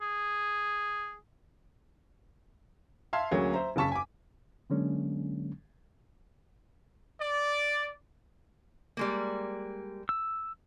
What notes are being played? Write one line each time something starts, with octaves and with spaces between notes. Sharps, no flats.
G#4
E5 F5 A5 C6 G#6
D2 F#3 A#3 C#4 G#4
C5 E5 A#5
F#1 C#3 A5 C#6 B6
G#5 D6
D3 F#3 G#3 A#3 C#4 D4
D5
G3 G#3 A#3
E6